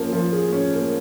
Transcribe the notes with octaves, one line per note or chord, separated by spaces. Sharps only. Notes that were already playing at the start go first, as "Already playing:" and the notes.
Already playing: F3 A#3 C#4
F3
G#4
C#4
A#3